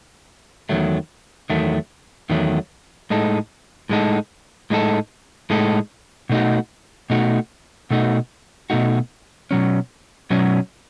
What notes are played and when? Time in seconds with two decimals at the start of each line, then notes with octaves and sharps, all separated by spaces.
0.69 E2 D#3 F#3 A3
1.50 E2 D#3 F#3 A3
2.30 E2 D#3 F#3 A3
3.10 A2 G#3 D#4 A4
3.89 A2 G#3 D#4 A4
4.70 A2 G#3 D#4 A4
5.50 A2 G#3 D#4 A4
6.29 B2 A3 D#4 F#4
7.10 B2 A3 D#4 F#4
7.90 B2 A3 D#4 F#4
8.70 B2 A3 D#4 F#4
9.51 B2 F#3 C#4
10.30 B2 F#3 C#4